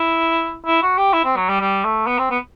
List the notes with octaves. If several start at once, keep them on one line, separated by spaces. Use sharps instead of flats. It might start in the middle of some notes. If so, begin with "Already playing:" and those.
Already playing: E4
E4
F#4
G4
E4
C4
F#3
G3
G3
A3
B3
C4
B3